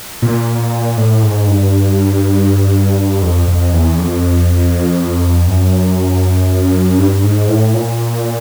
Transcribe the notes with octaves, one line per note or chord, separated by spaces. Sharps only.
A#2
A2
G#2
G2
F2
F2
E2
F2
F#2
G2
G#2
A2
A#2